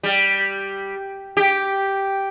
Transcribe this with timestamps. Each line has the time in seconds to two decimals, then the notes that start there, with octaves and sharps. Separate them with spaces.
0.03 G3
1.37 G4